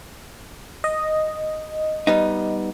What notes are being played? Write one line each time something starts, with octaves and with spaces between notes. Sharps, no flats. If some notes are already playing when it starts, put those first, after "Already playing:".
D#5
G3 B3 D#4